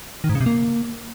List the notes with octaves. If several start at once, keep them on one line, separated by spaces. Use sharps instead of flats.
D#3
G#2
C#3
C3
A#3